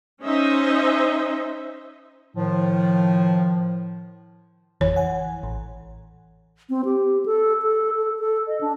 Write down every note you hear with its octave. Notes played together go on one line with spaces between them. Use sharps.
C#4 D#4 C5 D#5 E5
A2 D#3 F3
G#1 F2 E3 C#5
F#5 G#5
A1
C4
G4
A4
A4
A4
A4
D#5
D4